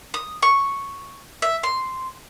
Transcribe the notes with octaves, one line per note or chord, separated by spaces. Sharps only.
D#6
C#6
E5
C6